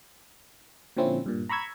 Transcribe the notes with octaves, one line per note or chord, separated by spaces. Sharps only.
A#2 D3 F3 C4 C#4 E4
G2 A#2
A#5 B5 C#6 E6 G#6